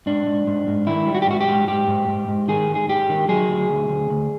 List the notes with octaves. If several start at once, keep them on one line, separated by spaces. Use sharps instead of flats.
G#2 D4
G#2
G#2
G#2
D#3 E4
G3
F#4
G4
G#2 F#4
G4
G#2
G#2 G4
G#2
G#2
G#2
D#3 G#4
G#2
G#4
G#2 G4
D#3
F#3 G#4
D2
D2
D2
D2